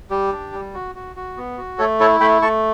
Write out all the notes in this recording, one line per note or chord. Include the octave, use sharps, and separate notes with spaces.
G3 G4
D4
G3
F#4
F#4
F#4
B3
F#4
A3 A4 C#5
E4 A4 C#5
A3 G5 B5
A3 A5 C#6